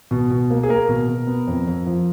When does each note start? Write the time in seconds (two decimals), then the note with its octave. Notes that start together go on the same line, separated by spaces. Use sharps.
0.11 B2
0.30 B2
0.50 A#3
0.63 G#4
0.69 A#3 A#4
0.89 B2
1.08 B2
1.27 B3
1.47 F2
1.67 F2
1.86 F3